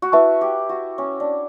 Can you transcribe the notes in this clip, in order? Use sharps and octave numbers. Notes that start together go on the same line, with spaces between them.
F#4
E4 B4 E5 A5 C#6
G4
F#4
C#4
D4